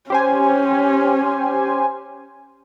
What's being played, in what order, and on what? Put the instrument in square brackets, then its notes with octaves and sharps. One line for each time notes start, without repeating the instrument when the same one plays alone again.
[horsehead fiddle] C#4 [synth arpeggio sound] G4 C5 G#5